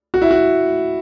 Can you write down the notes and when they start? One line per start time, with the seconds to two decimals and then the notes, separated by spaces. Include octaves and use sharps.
0.14 F#4
0.22 E4
0.31 F#4